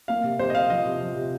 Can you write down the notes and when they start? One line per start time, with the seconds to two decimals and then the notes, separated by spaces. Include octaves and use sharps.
0.08 A#3 F5
0.24 C3
0.39 C3 C5
0.50 D#5
0.54 C3 F5
0.70 F3 D#5
0.85 C3
1.01 F3
1.16 C3